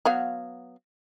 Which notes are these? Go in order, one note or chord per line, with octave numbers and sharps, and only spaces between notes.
F#3 B3 F5